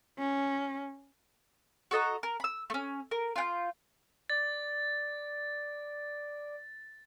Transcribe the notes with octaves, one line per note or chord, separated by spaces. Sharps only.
C#4
F#4 A4 D#5 A#5
A#4
B5 E6
A3 C#4
A#4
F4 G5 G6
D5 A6